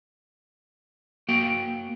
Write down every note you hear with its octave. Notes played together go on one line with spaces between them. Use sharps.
A#3 F#4 G5